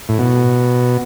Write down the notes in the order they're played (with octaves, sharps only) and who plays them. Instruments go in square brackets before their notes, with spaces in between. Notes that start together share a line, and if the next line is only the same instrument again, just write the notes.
[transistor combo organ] A2
B2